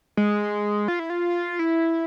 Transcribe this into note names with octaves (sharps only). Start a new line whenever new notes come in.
G#3
F4
E4
F4
E4